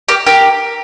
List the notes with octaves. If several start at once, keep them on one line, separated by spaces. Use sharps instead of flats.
G4 A#4
G4 A#4